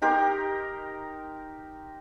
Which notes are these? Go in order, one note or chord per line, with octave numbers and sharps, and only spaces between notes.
D#4 G4 A#4 C6